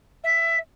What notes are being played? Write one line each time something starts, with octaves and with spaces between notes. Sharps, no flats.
E5